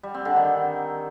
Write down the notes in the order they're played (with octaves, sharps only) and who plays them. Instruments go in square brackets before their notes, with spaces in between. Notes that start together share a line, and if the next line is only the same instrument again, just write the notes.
[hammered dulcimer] G3
C4
D3
D#3